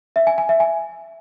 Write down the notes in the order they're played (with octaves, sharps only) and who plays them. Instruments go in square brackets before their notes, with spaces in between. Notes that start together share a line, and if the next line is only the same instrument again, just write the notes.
[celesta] E5
G#5
G#5
E5
G#5